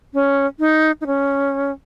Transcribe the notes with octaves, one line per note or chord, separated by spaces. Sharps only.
C#4
D#4
D#4
C#4